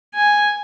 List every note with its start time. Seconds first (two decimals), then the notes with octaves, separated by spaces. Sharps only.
0.14 G#5